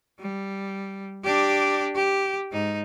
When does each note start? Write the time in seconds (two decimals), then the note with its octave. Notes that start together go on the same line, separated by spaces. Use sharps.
0.20 G3
1.23 D4 G4
1.95 G4
2.52 G#2 D#4